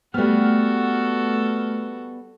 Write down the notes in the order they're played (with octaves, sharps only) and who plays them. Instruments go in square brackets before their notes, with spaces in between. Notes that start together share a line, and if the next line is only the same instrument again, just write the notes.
[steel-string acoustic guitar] G3 B3 [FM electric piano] A3 F6 [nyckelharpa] F#4 A4